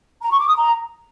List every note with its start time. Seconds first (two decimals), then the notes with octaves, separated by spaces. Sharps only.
0.22 A#5
0.31 C#6
0.39 D6
0.47 D#6
0.56 A#5